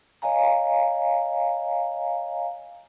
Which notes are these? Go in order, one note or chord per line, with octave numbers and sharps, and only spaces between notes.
C#5 D#5 F5 G#5 A#5